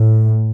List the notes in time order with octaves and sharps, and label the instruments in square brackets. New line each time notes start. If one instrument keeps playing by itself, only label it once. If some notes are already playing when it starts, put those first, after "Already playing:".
Already playing: [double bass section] A2